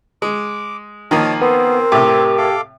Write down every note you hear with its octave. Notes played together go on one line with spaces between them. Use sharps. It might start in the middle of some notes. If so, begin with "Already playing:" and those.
G#3 D6
D#3 F3 A#3 C#5 D#5 A5
B3 C4 A#4 C5
A2 C3 G4
A4 F5 D6